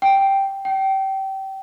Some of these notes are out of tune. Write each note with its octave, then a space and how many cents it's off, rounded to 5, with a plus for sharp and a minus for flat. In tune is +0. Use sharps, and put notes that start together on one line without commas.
G5 +0
G5 -25